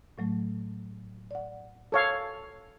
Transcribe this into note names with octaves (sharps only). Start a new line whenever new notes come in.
A2 F#3 A3
D5 F#5
A4 C#5 F5